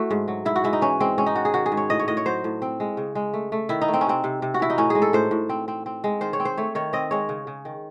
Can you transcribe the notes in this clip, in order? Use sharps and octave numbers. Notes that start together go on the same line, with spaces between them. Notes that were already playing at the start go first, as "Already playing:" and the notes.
Already playing: A3 E4 F#4
G#2
F#3
G#2 E4
F#4
G#3 E4
D#4
E3 C#4
G#3 C4
G#2 C#4
D#4
D#3 F#4
G#4
D#3 F#4
G#4
G#2
C#5
A2 D#5
C#5
A2 D#5
C#5
F#3 C5
A2
C4
G#3
C#3
G#3
A3
A3
D#3 E4
D#4
A3
C4
C#4
C3 C4
C3
C3
F#4
E3 E4
D#4
A2 C#4
G#3 G#4
A4
A2 C5
A2
C4
C4
C4
G#3
D#3 C5
C#5
C4
C5
A3 C#5
D#3 C#5
C4 D#5
G#3 C#5
C#3
C#3
D#3